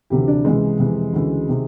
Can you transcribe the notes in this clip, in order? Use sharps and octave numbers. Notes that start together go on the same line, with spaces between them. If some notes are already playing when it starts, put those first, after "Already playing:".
D2 C3 E3 G4
D4
C#2 C3 E3 G#3
F2 C3 E3
D2 C#3 E3
C3 D#3